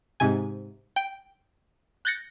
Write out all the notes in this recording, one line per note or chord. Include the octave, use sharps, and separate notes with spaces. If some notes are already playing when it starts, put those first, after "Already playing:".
G#2 C3 G#5
G5
F#6 G6 A6 A#6 C#7